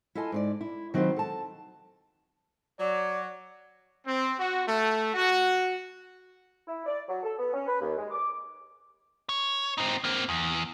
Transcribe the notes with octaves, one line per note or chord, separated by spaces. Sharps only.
E4 F4 A4 D#5 G#5 A5
G#2 G#4 D5
E4
D#3 F#3 C4 D#4 F4 B4
A4 A5
F#3 D5
C4
F#4
A3
F#4
E4
D5
F#3
A4
B3
C#4
B4
D#2
G#3
D6
C#5
C4 D#4
A#3 C4
E2